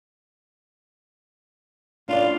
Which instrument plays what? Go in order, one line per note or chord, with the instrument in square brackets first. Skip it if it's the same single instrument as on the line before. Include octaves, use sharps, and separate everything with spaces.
[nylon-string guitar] D4 D5 [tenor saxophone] F4